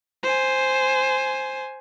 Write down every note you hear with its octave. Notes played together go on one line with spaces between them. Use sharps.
C5 G#5